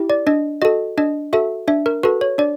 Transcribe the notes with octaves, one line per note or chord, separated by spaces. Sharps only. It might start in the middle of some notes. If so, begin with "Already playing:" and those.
Already playing: E4 G4
D5
D4 D#5
F#4 A4 D#5
D4 D#5
F#4 A4 E5
D4 E5
A#4
F#4 A4 B4
C#5
D4 D5